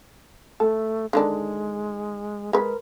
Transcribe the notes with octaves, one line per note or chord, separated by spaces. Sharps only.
A3 A4
D3 D#3 G#3 D4
G#3 A#4 B4